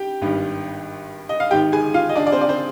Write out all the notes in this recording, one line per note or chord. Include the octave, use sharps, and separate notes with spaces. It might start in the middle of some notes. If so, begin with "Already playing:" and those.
Already playing: G4 G5
G#1 G2 D#3 G3
D#5
F5
G#1 G#2 D#3 G4 G5
G#4 G#5
F4 F5
D#5
D4 D5
D5
C4 C5
D5
C4 C5